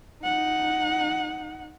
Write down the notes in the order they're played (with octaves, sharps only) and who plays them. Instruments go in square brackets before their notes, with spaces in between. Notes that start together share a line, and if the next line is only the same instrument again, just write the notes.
[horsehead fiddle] D#4 F#5